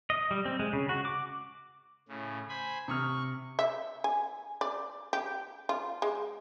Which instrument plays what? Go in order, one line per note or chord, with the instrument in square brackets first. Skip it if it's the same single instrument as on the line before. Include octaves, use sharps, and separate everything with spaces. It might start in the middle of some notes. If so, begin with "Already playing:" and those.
[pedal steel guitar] D#5
G3
C4
G#3
C#3
F#4
D6
[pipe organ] A2 C#3
C5 G#5 B5
[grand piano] C3 D#6 F6 [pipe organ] C#6
[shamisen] E5
G#5
D5
G4
F4
G#3